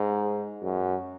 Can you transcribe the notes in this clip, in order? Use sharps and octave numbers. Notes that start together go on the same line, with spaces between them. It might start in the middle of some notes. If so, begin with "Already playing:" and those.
Already playing: G#2
F#2